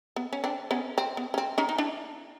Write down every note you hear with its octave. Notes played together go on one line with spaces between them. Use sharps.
B3
C#4
C4 D4
B3 C#4
C4
B3
C#4
C4
C#4 D#4
D#4
D4 E4